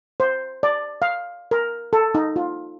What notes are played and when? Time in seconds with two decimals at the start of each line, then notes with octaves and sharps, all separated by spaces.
0.20 C5
0.63 D5
1.02 F5
1.51 A#4
1.93 A4
2.15 D#4
2.36 F4